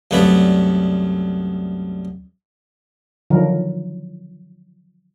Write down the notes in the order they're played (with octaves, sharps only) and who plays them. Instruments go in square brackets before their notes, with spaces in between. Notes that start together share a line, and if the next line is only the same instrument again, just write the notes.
[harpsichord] C2 F#2 A3 B3 D5 B5
[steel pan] D3 D#3 F3 F#3 A#4